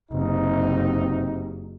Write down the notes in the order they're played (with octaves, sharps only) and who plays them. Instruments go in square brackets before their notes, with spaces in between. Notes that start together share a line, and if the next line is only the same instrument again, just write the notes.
[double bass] F#1 [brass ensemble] C3 D#4